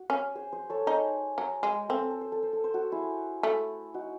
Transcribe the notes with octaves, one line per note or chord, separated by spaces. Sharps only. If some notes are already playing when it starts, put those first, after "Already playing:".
Already playing: F#4
C#4
G#4 C5
G#4 C5
A4 C#5
D#4 G#4 C5
F#3
G#3
C4 A4
C5
A4
C5
A4
C5
A4
C5
F#4 A4
E4 G#4
A3
D#4 F#4